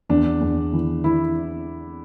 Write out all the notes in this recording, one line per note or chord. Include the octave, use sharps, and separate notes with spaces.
E2 D4
E2
E3
E3 E4